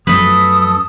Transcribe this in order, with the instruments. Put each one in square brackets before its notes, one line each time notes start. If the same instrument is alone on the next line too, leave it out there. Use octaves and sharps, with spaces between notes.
[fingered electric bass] F#2 [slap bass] F3 A3 [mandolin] A4 B4 [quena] D#6